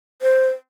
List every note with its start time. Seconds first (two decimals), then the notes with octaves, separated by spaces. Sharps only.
0.22 C5